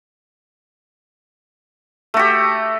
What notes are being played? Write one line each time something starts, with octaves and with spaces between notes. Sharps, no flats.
A3 F#4 G4